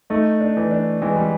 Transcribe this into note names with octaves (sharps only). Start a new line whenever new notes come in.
A3 D#4
D4
E3
D4
E3 G#3
G3